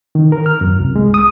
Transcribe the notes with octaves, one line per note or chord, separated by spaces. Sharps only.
D#3
A#4
F6
F#2
C2
G#3
D#6